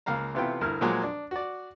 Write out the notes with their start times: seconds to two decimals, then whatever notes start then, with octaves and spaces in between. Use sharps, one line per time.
0.06 C#2 A#3 F5 A#5
0.34 A1 C3 B3 E4 F4 G5
0.61 D2 G2 E4 A#4 F6
0.81 A#2 F3 F#3 G#3 A#3
1.03 D4
1.31 F#4 D5